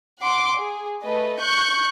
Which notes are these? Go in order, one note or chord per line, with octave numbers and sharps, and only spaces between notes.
F#5 C6 D6
G#4
A3 B4 D#5
C#6 F#6 G6 C#7